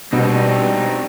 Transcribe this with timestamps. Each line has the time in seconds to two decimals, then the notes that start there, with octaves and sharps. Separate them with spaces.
0.13 B2 G3 C4 D4 D#4 F#4